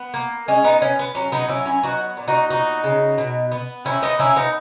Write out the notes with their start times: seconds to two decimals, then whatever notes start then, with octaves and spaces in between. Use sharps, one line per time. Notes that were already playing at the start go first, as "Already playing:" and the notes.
Already playing: B3
0.14 A#3
0.48 G#3 C#4
0.64 B3 D#4
0.81 B3 C#4
0.99 B3
1.15 F#3 C#4
1.32 B3 D#4
1.48 F#3 C#4 E4
1.65 C#4 E4
1.83 B3 D#4 F#4
2.17 A#2
2.28 D#4 F#4
2.50 B3 D#4 F#4
2.84 C#3
3.18 B2
3.52 B3
3.85 D#3 C#4 E4
4.02 B3 D#4
4.19 A#3 C#4 E4
4.36 B3 D#4